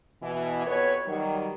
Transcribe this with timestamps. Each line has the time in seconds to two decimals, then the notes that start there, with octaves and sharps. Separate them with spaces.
0.22 B2 E3
0.65 F2 B3 B4 C#5
1.06 D#3 F#3 G3